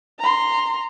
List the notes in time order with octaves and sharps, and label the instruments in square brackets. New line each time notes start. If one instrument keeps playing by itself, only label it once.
[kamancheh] A#5 C6